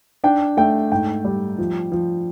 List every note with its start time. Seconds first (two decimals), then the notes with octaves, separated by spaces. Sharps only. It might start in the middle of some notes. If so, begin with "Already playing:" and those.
0.24 D4 G5
0.57 A3 G5
0.92 G#2 G5
1.24 G3
1.58 F3
1.92 F3